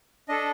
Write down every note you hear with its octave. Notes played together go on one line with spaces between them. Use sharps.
D4 A4 D#5